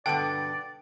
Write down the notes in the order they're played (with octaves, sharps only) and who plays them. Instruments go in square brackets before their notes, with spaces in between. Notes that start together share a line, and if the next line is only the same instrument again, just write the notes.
[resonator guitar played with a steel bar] G2 B2 D3 [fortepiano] B3 A4 F#5 [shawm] D5 [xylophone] G5